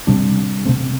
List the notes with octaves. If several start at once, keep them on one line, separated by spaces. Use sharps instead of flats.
C3 G3 D4
C3 A3 C4